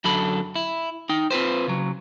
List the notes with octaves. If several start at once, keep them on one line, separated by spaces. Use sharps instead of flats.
F#2 D3 F#3 A4 B5
E4
D#4 G5
C4 F4 B4 C5
C#3 F#3